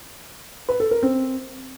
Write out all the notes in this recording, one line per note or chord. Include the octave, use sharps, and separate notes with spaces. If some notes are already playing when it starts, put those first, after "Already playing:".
B4
A4
A#4
C4